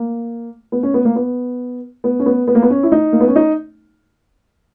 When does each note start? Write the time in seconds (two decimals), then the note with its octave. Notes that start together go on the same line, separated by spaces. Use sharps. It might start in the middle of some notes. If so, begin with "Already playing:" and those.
Already playing: A#3
0.72 B3
0.83 C#4
0.94 B3
1.05 A#3
1.16 B3
2.04 B3
2.20 C#4
2.26 B3
2.47 B3
2.55 A#3
2.62 B3
2.70 C#4
2.83 E4
2.92 D#4
3.13 A#3
3.21 B3
3.28 C#4
3.36 D#4